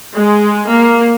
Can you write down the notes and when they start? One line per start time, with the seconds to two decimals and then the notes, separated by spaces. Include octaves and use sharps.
0.18 G#3
0.69 A#3